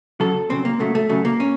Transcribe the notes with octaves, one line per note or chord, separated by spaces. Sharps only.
F#2 C#3 F#3 A4
F#2 C#3 F#3 C4
A#3
F#2 C#3 F#3 A3
A3
F#2 C#3 F#3 A3
A#3
C#4